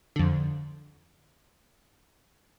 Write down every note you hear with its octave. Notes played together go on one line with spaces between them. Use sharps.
F2 D3